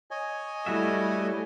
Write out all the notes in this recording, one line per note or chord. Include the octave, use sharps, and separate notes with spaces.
C#5 D#5 G#5
G3 A3 E4 F#4 E5